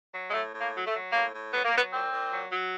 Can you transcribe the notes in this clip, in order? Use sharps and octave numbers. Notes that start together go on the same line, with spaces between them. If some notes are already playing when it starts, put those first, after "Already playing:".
F#3
G#3
A2 A3
A2
A#3
F#3
A3
F#3
A2 A#3
A2
F#3 B3
A#3
F#3 B3
A#2 C4
A#2
F#3
F#3